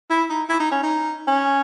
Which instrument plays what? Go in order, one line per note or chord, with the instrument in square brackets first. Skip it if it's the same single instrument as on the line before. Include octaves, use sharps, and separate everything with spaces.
[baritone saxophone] E4
D#4
E4
D#4
C#4
D#4
C#4